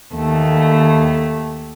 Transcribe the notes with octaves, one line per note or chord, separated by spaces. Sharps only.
D#2 A3